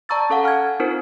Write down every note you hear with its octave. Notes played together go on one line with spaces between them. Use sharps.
D5 A5 A#5 C#6 E6 A6
C#4 A4 F5 F#5
G#5 F6 F#6 G#6
C4 D#4 F4 A#4 C5